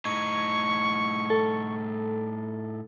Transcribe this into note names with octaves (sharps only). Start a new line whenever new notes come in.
A2 D#4 C#6 G#6
A4